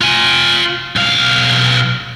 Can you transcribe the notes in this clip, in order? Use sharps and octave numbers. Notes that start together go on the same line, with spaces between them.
F4 G#5
B1 F5